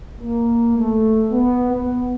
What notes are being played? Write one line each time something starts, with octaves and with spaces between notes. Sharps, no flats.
A#3
A3
B3
B3